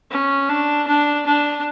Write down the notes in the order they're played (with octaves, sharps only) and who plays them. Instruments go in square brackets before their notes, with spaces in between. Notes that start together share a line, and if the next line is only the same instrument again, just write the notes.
[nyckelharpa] C#4
D4
D4
D4